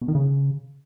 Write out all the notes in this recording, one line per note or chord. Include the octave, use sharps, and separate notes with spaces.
B2
D#3
C#3